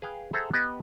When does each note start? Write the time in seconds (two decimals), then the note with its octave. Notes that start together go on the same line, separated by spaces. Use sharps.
0.02 G#4 B4 F5 G5
0.33 G#4 A4 C5 E5 F#5 A#5
0.54 B3 G4 D#5